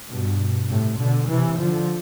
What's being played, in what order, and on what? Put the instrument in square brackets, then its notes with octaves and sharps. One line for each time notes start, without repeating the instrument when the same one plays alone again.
[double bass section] G2 B2
A2 C3
B2 D3
C3 E3
D3 F3